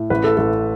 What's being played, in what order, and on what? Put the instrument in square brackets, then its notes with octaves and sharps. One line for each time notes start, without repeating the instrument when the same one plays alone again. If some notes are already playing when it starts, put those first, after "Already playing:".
Already playing: [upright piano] A2
A1 B4
A4
A1 A4